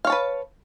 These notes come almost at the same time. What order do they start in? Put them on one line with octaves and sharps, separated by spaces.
F5 C#5 A5 B4